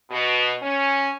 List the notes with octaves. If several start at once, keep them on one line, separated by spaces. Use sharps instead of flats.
B2
C#4